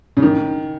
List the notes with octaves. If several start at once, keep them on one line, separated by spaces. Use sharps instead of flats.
C#3
D#3